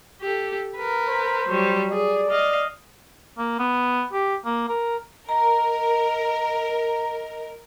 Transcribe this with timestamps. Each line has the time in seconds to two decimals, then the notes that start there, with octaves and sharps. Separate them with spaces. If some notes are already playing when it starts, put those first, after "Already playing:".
0.22 G4 A4
0.76 A#4 B4
1.09 C5
1.48 F#3 G3
1.91 G#4 D5
2.31 D#5 F5
3.38 A#3
3.59 B3
4.13 G4
4.45 A#3
4.69 A#4
5.29 A#4 D#5 A#5